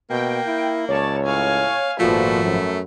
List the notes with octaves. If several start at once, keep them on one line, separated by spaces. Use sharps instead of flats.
B2 A#3 G5
E4
C#2 C#5 D5 A5
A2 F5 G#5
G#1 A#2 F3 A3 F#4 B4
F#2